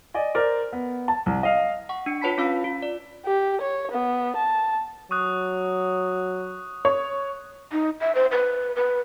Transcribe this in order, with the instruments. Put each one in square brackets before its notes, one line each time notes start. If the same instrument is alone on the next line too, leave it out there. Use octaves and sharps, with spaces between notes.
[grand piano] D5 D#5 G#5
A#4 C5 D5
B3
A5
C2
D#5 F5
[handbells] F#5 C#6
D4 C#7
F4 B4 C#5 A5 B5 B6
C#4 F4 F5 B5 E6
F4
D5
[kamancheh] G4
C#5
B3
A5
[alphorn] F#3 [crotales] C#6 D#6 F#6
[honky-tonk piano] C#5
[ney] D#4
E5
C5
B4
B4